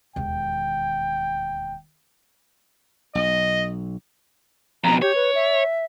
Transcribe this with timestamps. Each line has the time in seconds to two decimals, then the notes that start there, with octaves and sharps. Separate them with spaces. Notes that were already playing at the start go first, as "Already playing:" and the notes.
0.16 E1 D#2 G5
3.15 B1 D#5
4.84 F2 B2 A#5
5.02 G4 C#5
5.15 B4
5.35 E5